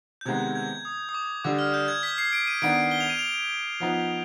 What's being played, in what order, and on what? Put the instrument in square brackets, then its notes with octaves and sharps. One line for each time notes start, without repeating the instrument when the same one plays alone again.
[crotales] G6
[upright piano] C3 D#3 G#3 B3 [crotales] G#6
[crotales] G#6
D#6
D#6
D6
[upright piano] D3 G3 D4 [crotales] D6
[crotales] F6
G6
G#6
B6
C7
D7
D#7
[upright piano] D#3 B3 D4 [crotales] D7
[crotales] G7
F7
D#7
F7
[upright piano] F3 B3 D#4